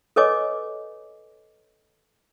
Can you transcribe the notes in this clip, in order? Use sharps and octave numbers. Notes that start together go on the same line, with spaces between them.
A4 B4 C#5 D#5 G#5 D6